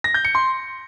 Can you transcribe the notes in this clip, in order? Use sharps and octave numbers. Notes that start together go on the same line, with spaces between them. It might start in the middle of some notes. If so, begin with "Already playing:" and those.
A#6
G6
C#7
C6